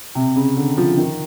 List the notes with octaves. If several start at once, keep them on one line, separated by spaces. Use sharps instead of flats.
C3
C#3
D3
F3
D#3